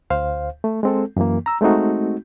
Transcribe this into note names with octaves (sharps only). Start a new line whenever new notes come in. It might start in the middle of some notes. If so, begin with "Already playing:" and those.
D2 C5 F5
A3
G#3 C4 A4
F#2 E3 A#3
A#5 E6
G#3 A3 C4 D#4 F#4